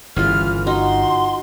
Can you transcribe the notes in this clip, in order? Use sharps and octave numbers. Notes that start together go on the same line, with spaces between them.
G1 C#3 E3 F4 F6
D#4 F#4 C6